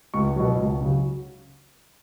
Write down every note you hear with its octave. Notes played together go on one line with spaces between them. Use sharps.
C#2 C#6
B2 F#3
C#2
C#3 F#3